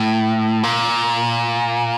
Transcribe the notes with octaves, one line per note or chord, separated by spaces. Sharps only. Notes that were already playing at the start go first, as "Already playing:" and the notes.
Already playing: A2
A#2